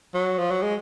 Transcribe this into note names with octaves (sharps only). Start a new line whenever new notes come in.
F#3
F3
F#3
G#3